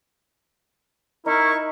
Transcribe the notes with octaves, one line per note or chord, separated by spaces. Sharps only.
D#4 E4 A#4 C#6